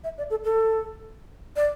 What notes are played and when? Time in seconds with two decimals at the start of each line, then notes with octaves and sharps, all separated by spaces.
0.04 E5
0.18 D5
0.30 A4
0.44 A4
1.56 D5